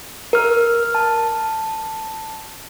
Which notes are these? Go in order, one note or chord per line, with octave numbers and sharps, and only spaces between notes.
A#4 F6
A5